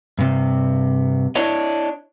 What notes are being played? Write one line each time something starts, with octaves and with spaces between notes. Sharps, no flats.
G2 C3
D4 E4 C#5 D#5